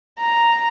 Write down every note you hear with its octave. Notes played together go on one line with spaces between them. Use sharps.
A#5